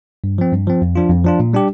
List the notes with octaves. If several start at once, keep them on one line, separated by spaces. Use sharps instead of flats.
G2
F3 C4
G2
F3 C4
F2
F3 D4 F4
F2
F3 D4 F4
A#2
G3 D4 G4